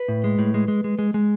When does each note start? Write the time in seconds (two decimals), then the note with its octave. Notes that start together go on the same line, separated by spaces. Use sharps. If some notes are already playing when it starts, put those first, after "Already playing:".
Already playing: B4
0.08 A2
0.24 G#3
0.39 A2
0.54 G#3
0.68 G#3
0.84 G#3
0.99 G#3
1.14 G#3